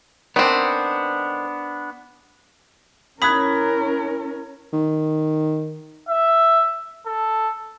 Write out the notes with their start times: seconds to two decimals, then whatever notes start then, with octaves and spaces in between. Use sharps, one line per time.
0.36 D#3 B3 C4 D4
3.22 C#4 E4 A#4 B5 D#6 F#6 G#6 B6
4.73 D#3
6.09 E5
7.06 A4